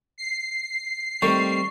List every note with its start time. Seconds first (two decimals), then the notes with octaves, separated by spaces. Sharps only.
0.18 C7
1.22 D#3 G3 A3 C4 C#6